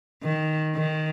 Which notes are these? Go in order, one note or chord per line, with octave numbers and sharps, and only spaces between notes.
D#3
D#3